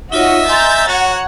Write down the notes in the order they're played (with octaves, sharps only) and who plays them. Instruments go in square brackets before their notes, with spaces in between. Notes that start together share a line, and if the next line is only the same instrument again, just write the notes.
[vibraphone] D#4 F4 C#5 [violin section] F#4 D#5 [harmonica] E5
[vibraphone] D#5 G#5 C6 [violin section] A#5 G6 A6
[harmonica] F#4 [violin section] C#5 F#5 [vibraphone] A#5